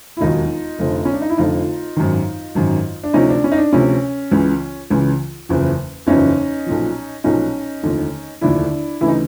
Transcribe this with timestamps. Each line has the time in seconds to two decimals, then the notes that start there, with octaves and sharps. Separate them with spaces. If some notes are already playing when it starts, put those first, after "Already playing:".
0.17 E4
0.21 E1 D#2 D#3 F#3 D#4 F4
0.79 F1 F2 D3 F3
1.05 C#4
1.14 D4
1.22 D#4
1.30 E4
1.37 F1 F2 D3 F3 D#4 F4
1.97 G#1 F#2 D#3
2.55 G#1 F#2 D#3
3.03 D4
3.13 D2 C3 F3 C#4 D#4
3.29 D4
3.44 C#4
3.52 D#4
3.57 D4
3.72 D2 C3 F3 C#4
4.31 C#2 C#3 E3
4.90 C#2 C#3 E3
5.49 F#1 E2 C#3 F3
6.07 F#1 E2 C#3 F3 C#4 D#4
6.66 B1 A#2 F3
7.24 B1 A#2 F3 C#4 D#4
7.83 F1 D#2 D3 F3
8.41 F1 D#2 D3 F3 D4 E4
9.00 D2 C#3 E3 E4
9.08 D#4